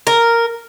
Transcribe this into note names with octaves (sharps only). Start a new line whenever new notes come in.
A#4